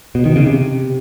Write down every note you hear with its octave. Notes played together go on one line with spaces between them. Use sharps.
B2
D#3
C#3
C3